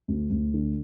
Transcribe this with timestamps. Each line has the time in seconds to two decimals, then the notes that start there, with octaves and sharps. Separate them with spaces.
0.08 D2
0.30 D2
0.54 D3